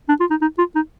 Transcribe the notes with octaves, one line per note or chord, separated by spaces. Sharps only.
D4
F4
D#4
D#4
F4
D#4